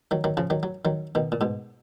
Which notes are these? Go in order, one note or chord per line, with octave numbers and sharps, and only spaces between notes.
D#3 F#3
D#3 F#3
C#3 F3
D#3 F#3
F#3
D#3 F#3
B2 D#3
A#2
G#2 B2